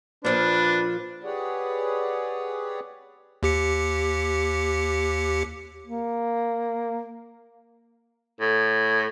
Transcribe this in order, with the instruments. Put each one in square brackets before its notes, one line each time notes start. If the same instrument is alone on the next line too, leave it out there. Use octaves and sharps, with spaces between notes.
[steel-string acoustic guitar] A#2 F3 F4 [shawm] D4 [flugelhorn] B4
[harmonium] G4 G#4 B4 C#5 D5 F#5
[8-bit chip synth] D#2 G4 C#7
[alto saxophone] A#3
[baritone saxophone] A2